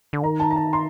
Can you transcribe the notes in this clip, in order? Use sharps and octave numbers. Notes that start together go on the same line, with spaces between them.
D3
D#3 A#5
A5
A#5
A5
C6